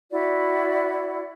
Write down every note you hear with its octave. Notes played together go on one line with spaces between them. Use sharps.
E4 F#4 D5